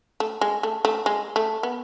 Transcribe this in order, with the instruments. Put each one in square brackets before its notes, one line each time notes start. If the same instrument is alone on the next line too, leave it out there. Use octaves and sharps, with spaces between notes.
[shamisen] A3
G#3
A3
A3
G#3
A3
B3